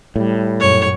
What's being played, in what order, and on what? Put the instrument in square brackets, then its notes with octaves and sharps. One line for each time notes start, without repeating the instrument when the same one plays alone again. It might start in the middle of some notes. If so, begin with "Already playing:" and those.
[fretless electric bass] A2 [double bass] G3
[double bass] F#2 A#2 [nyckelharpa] C#5